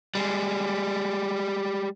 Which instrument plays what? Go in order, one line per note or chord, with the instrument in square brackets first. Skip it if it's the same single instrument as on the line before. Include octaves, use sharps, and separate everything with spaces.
[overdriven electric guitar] G3 G#3